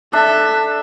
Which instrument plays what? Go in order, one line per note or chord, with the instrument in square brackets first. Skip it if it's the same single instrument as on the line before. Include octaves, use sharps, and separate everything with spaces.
[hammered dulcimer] D4 [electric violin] A4 E5